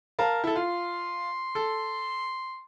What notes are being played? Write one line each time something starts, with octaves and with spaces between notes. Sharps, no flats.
A#4 F5 A5
E4 A4
F4 C6
A4